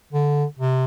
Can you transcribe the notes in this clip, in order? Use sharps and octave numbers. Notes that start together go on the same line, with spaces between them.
D3
C3